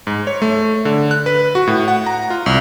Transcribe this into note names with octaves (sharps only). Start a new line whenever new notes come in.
G#2
C#5
A3
D3
F#6
B4
F#4
A2
F#5
A#5
F4
C2